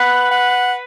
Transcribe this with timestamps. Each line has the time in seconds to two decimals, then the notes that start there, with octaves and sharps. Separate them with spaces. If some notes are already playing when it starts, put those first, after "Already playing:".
Already playing: B4 F#5
0.31 F#5